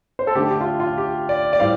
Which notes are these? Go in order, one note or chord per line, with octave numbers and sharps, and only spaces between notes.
C5
A4
D3 A3 D4 G4
G4
F4
F4
G4
D5
D5
A2 G3 C4 F5